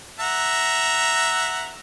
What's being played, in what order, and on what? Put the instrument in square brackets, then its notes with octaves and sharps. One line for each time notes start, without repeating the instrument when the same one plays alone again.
[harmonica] E5 F#5 A#5